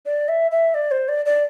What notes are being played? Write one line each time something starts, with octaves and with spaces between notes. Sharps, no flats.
D5
E5
E5
D5
C5
D5
D5